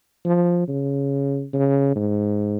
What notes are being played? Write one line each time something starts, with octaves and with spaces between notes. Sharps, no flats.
F3
C#3
C#3
G#2